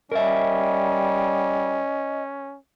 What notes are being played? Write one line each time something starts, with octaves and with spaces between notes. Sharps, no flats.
G3 C#4 A#4 D#5 E5